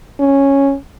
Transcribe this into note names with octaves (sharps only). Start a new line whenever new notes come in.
C#4